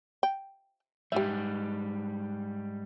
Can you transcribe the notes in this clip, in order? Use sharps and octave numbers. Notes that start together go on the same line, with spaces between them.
G5
G#2 G3 G4 E5